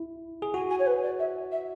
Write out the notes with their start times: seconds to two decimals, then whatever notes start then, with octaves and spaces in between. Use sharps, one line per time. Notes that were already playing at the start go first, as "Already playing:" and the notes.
Already playing: E4
0.42 G#4
0.54 F#4 G#5
0.70 G#5
0.79 C#5
0.86 B4
1.03 D5
1.19 E5
1.51 E5